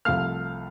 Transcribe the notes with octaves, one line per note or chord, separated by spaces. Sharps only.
C2 C3 F3 A3 F5 F6